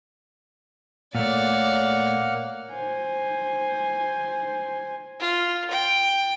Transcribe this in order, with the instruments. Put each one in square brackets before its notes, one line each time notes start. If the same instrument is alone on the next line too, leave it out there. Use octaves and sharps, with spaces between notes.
[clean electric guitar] A#2 A3 [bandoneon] A#3 F#5 F6 [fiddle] C#5 D5
[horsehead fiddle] C5 G#5
[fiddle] F4
G5